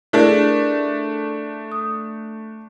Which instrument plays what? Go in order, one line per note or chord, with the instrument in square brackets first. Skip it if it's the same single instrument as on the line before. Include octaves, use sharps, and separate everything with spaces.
[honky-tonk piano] A3 D4 [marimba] E4 G#4 A#4
[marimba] D#6